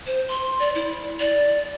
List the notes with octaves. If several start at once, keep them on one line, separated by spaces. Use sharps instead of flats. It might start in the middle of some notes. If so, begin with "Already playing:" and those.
C5
C6
D5
E4
D5